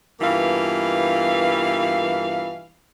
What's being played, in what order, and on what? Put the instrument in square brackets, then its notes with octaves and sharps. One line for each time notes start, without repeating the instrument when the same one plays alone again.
[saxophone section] G2 B2 E3 A#3 F4 F5